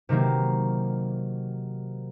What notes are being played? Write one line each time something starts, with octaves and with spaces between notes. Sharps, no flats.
C3 D#3 F#3 A#3